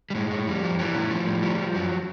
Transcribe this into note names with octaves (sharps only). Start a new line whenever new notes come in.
G3
A2 G#3
A2
F2 G3
F3
E3 G3
A2
F3
A2
F3 G3
F3
F#2 F#3